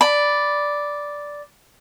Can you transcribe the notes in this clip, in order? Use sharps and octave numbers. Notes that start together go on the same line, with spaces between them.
D5 B5